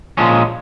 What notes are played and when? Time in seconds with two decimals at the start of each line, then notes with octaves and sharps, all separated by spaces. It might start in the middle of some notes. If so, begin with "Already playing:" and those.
0.17 A#2 F3 G#3 C#4